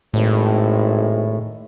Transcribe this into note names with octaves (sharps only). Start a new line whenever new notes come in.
G#1 A2